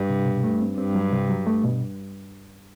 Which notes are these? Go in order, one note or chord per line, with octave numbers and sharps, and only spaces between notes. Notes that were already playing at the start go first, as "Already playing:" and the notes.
Already playing: G2
C3
B2
A3
C4
G2 C4
F#3
C3
F#3
A3
B2